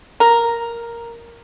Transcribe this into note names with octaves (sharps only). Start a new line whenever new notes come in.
A#4